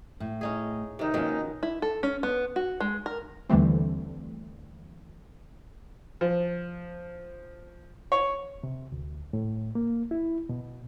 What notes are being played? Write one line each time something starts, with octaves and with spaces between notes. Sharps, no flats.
A2
C#4 D#4 G#4
C3 D#3 D#4
B2 D#3 F3 A#3 C#4
E4
A4
C#4
B3
F#4
G#3
A#4
D#2 D3 E3 G3 A3 C4
F3
C#5
C3
D2
A2
A#3
E4
B2